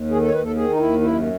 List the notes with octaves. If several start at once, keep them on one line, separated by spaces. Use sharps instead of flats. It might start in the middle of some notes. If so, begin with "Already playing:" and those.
Already playing: D#2
D#3 G#4
A4
C#5
D#2 B4
A4
D#3 G#4
D#4
D#2 E4
F#2 E4